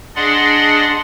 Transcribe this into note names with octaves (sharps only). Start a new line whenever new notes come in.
D4 G#4 D5 D#5 F#5 C6